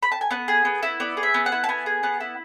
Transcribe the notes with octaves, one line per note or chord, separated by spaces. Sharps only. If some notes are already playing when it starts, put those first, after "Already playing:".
B5
A5
G#5
B3 F#5
G#4
B3
E4
B3 D5
G#4
E5
B3
F#5
E4
A5
B3 G#5
G#4
B3 F#5
E4